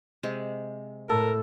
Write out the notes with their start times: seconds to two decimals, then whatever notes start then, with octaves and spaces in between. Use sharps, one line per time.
0.23 C3 G#3
1.09 A2 A4 A#4